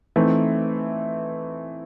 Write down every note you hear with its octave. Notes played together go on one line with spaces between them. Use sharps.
E3 A3 C4 D#4